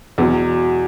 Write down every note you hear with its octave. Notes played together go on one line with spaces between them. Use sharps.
E2 B2 F#3